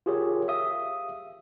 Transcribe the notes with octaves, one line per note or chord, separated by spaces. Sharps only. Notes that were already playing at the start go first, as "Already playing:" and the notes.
F4 G4 G#4 A#4 C#5
E5 F5 D#6